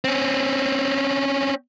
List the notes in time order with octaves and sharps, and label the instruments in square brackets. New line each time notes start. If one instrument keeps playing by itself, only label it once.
[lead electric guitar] C4 C#4